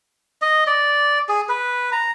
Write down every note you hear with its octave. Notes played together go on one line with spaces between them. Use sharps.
D#5
D5
G#4
B4
A#5